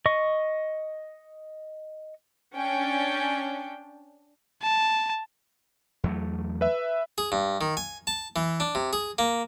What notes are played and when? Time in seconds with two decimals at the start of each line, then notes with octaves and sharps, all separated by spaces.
0.06 D#5 C#6
2.54 C#4 D4 G5
4.62 A5
6.04 E2 F#3 A3
6.61 B4 E5
7.18 G#4
7.32 G2
7.61 D#3
7.77 G#5
8.07 A5
8.36 E3
8.60 D4
8.75 C3
8.93 G#4
9.18 A#3